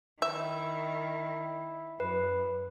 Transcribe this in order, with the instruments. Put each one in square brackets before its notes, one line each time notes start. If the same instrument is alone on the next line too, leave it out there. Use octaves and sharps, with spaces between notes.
[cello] D#3 [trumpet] E4 [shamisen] E5
[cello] F#2 [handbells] B4